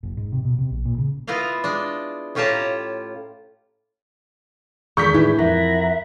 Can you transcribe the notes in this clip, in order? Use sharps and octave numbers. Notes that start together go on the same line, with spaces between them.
F#1
G#2
C3
B2
C3
A#1
A#2
C#3
B3 E4 F4 D#5 F5
G#3 D4
A2 C#4 F4 G4 A5 A#5
E2 D#3 G#3 D4 G#4 C#6 G6 B6
A2 E3
F2 A#4 E5 F#5 A#5